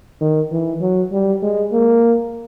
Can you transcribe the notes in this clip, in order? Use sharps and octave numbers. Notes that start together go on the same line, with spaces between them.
D#3
E3
F#3
G3
G#3
A#3